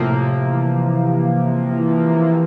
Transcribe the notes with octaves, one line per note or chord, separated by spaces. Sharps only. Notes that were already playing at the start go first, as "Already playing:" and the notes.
Already playing: A2 C3 F3 A#3
E3
E3